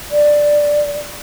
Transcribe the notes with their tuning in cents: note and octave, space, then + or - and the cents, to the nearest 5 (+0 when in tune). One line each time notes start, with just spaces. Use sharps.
D5 +5